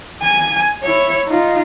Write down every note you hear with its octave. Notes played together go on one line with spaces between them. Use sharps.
G#5
E4 C#5
D#4 F4